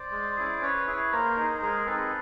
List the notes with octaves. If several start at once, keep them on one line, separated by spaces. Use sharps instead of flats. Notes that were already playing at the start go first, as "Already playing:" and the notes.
Already playing: C5 D5
G#3
C#4 E4 G#4
C#4 B4 C#5
E4 G#4
A#3 A#4 C5
D#4 G#4
G#3 G#4 A#4
C4 D#4 G#4 A4 B4